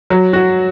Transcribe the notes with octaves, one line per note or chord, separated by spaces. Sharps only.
F#3
F#4